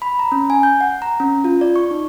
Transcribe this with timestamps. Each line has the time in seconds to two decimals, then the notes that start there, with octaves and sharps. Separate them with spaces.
0.02 B5
0.19 A#5
0.32 C#4
0.50 G#5
0.63 G6
0.81 F#5
1.02 A#5
1.20 C#4
1.44 F4
1.61 D5
1.76 C#6
1.91 D#4